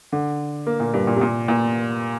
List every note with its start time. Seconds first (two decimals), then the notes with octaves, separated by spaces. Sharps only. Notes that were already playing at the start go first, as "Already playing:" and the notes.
0.13 D3
0.67 A#3
0.80 A#2
0.94 G2
1.07 A#2
1.16 C3
1.21 A#2
1.48 A#2